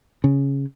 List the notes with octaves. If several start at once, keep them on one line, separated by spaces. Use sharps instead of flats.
C#3